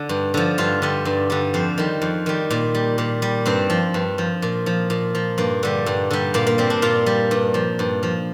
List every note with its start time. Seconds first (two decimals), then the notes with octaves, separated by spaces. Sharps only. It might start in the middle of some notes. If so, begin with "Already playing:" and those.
Already playing: D3
0.09 G2
0.34 D3 F3
0.58 G2 F4
0.82 D3 G3
1.05 G2
1.30 D3 G3
1.54 F2 C5
1.78 D#3 G3
2.02 F2
2.26 D#3 G3
2.50 A#2
2.75 G3
2.98 A#2
3.22 G3
3.46 G2 C4
3.70 F3
3.94 G2
4.18 F3
4.42 A#2
4.66 F3
4.90 A#2
5.15 F3
5.38 G2 A#3
5.63 D3 G3
5.86 G2
6.11 D3 G3
6.34 A#2 A#3
6.47 A#3
6.58 G3 C4
6.70 D4
6.82 A#2 F4
7.06 G3
7.31 G2
7.54 F3
7.79 G2
8.03 F3